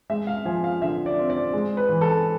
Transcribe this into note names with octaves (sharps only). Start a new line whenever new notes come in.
G#3 E5
F5
F3 G#5
F5
D3 E5
D5
C4
D5
G#3
B4
E3
A4